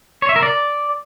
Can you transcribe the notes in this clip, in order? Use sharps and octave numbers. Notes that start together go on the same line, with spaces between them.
C#5
E5
A#4
D5